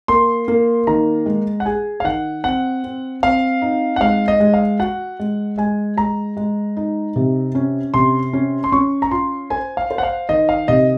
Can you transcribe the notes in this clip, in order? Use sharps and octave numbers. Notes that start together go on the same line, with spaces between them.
A#3 C6
A#3
D#3 A#5
G#3
F#5
G#4 G#5
F5
D#3 F#5
C4 F#5
C4
C4 F5
D#4
F#5
G#3 F5
D#5
G#3
F5
F#4 F#5
G#3
G#3 G#5
G#3 A#5
G#3
D#4
C3
C#4
C3 C6
C#4
C6
C#4 C#6
A#5
F4 C6
C5 G#5
F5
C5
F#5
F5
D#3 D#5
F5
C3 D#5